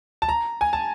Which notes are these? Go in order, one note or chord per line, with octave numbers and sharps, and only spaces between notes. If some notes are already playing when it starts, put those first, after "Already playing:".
A5
A#5
G#5
A5